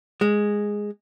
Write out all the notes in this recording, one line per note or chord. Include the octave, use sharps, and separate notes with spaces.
G#3